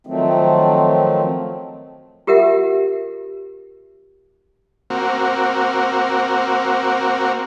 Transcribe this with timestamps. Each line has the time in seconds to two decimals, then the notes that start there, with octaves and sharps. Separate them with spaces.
0.07 D#3 F3 F#3 A3 C4
2.27 F4 G4 A#4 E5 F#5
4.90 A#3 C4 F#4